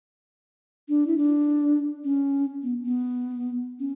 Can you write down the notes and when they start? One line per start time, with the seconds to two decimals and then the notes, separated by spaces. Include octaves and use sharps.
0.89 D4
1.07 E4
1.18 D4
2.05 C#4
2.63 B3
2.84 B3
3.80 C#4